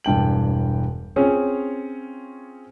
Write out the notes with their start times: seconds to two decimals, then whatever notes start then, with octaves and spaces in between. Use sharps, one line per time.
0.04 E1 G2 G5 F#7
1.16 C4 C#4 F4 G#4 C#5